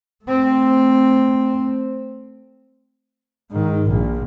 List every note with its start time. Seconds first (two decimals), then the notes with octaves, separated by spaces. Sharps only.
0.25 A3 C4
3.51 G#2 D#3
3.87 A#1 A#2